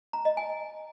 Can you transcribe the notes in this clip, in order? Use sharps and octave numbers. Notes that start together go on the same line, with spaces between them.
A#5
D#5
G#5